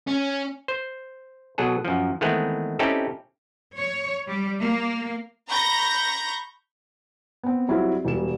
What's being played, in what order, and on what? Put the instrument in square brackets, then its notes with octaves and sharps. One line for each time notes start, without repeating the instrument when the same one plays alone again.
[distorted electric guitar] C#4
[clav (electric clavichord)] C5
B2 F#3 G#4 A4
F#2 F3
D#3 E3 G#3 A3 B3 C4
C4 C#4 D#4 E4 G4 A4
[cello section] C#5
G3
A#3
[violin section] A#5 B5 C#6 G6 A#6
[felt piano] B3 C4
F#3 G3 C4 E4 F4 G#4
E1 G3 E7